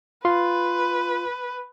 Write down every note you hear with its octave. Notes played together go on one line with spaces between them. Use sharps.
F4 B4 C6